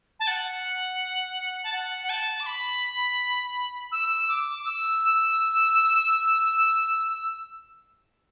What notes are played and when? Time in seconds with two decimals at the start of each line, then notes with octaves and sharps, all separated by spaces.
0.20 A5
0.27 F#5
1.63 A5
1.73 F#5
2.03 F#5
2.09 A5
2.40 D6
2.46 B5
3.92 E6
4.29 D6
4.58 D6
4.65 E6